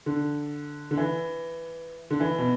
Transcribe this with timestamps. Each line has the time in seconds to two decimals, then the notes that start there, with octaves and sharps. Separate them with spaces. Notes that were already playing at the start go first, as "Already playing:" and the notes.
0.06 D3
0.91 D3
0.97 E3
2.10 D3
2.20 E3
2.38 B2